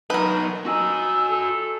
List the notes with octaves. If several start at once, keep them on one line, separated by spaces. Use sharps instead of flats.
F#3 D#4 A#4 B4
D#4 F#4 G#5 E6
A4